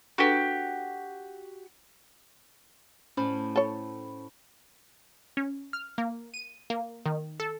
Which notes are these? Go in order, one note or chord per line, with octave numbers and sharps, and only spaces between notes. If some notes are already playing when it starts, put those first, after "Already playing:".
D4 F#4 G4 A4 B4
A2 C#4 C5 B5
A4 C#5
C#4
F6
A#3
D#7
A#3
D#3
A4